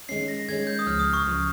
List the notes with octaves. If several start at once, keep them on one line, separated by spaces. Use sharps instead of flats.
D#3 G#3 C#4 C7
A#6
D#3 G#3 C#4 G#6
G6
D#6
C#2 C#3 F3 F6
D#6
C#6
C#2 C#3 F3